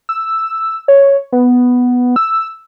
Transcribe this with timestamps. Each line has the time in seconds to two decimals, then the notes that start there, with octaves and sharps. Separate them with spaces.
0.09 E6
0.88 C#5
1.33 B3
2.16 E6